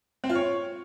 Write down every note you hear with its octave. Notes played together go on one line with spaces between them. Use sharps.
C4
F4
C#5